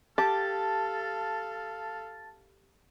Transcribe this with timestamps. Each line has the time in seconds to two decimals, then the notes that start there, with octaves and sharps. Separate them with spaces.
0.18 G4 A4 F5 A5 A6